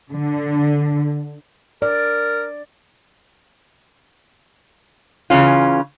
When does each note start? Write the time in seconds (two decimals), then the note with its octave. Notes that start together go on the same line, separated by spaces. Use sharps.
0.12 D3
1.82 A#4 D5
5.30 C#3 E3 C#4 F4